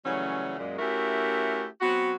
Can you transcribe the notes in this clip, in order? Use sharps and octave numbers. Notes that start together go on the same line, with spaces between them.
C#3 E3 F#3 G3 A3 C#4
F#2 A#2 G#3
A3 C#4 E4 F#4 G4 A#4
F#3 B3 C4 F#4